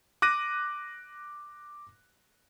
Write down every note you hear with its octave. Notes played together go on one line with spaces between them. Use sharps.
D6 F#6 A#6 D#7